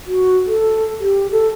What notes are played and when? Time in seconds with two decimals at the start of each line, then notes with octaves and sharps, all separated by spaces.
0.07 F#4
0.47 A4
1.01 G4
1.32 A4